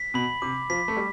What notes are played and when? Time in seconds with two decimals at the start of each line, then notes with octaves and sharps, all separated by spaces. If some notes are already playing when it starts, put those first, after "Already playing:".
Already playing: B6
0.14 B2 B5
0.42 C3 D6
0.70 F3 B6
0.88 A3
0.97 G3